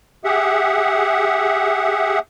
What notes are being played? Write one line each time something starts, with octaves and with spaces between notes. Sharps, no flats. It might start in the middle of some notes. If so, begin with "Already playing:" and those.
G4 G#4 E5 F#5